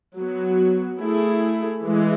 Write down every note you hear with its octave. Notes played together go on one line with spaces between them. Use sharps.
F#3 B3 F#4
A3 E4 G#4
E3 G#3